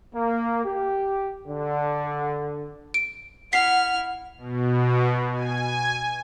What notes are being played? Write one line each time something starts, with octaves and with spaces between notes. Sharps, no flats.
A#3
G4
D3
D7
E4 F#5 F6 B6 C7
B2
G#5